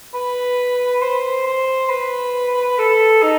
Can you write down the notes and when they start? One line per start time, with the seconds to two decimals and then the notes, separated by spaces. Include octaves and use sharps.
0.14 B4
1.02 C5
1.46 C5
1.90 B4
2.79 A4
3.23 D#4